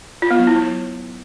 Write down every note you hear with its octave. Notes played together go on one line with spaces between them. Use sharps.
F4
B3
F#3
E4
F#3